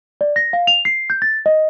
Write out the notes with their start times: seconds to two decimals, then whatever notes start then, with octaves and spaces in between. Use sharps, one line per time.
0.21 D5
0.36 A#6
0.53 F5
0.67 F7
0.85 C7
1.10 G6
1.22 A6
1.46 D#5